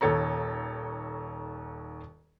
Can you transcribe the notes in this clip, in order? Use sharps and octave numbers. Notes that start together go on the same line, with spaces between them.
D#1 D#2 A4 C#5 A#5